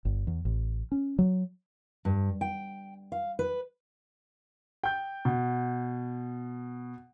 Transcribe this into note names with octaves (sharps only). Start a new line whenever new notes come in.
G1
E2
A1
C#4
F#3
G2
G5
F5
B4
G5 G6
B2